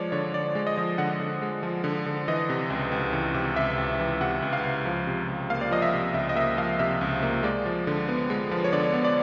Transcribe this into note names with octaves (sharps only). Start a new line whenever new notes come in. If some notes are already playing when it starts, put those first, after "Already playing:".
Already playing: F3 G#3 C#5 D5
D3 C#5
D3 D5
G#3
D#5
F3
D3 F#5
D3
G#3
F3
D3
D3
E3 D#5
C3
C#2
C#2
E3
C3
C#2 E5
C#2
E3
C3 F#5
C#2
F5
C#2
F3
C3
C#2
A#3 F5
D5
F3 D#5
E5
C3
C#2 E5
D#5
A#3 E5
F3 F5
C3 E5
C#2
A#3
G#3 D5
F3
D3
B3
G#3
F3
C#5
D3 D5
B3
D5